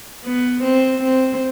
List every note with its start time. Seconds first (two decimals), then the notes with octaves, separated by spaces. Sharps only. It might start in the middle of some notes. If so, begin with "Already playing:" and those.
0.25 B3
0.64 C4
1.02 C4